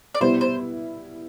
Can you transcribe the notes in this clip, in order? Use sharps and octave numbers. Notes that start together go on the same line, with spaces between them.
D5
B2 G3 B3 E4 C5
C5